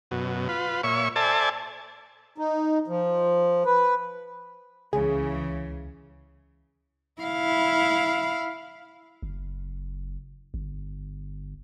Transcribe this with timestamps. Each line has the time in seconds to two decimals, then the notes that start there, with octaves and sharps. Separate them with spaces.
0.11 F#2 B2
0.49 F4 B4
0.84 A#2 C#5 E5 C#6
1.16 A4 C5 D5 E5 G#5 A5
2.38 D#4
2.88 F3
3.66 B4
4.93 C#2 C#3 E3 G#4
7.21 E4 F5
9.22 F#1
10.54 G1